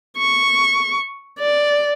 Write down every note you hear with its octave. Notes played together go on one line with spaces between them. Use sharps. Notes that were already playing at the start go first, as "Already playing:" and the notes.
C#6
D5